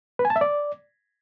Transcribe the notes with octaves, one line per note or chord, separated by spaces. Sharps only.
B4
G#5
A5
E5
D5